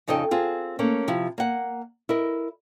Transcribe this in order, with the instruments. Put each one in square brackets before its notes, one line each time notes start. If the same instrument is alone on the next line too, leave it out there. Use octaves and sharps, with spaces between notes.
[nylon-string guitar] F2 C#3 D#4 A4 D#5 G5
C4 F4 G#4
A3 A#3 C#4
C3 F3 E4
A#3 F#5
E4 A#4 D#5